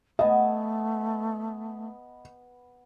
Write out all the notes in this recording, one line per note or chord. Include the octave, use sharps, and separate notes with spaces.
A3 B3 D#5 G#5 A5